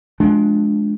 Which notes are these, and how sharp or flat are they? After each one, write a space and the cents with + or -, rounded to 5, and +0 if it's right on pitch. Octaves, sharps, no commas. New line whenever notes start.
F3 +10 G#3 +25 D4 +0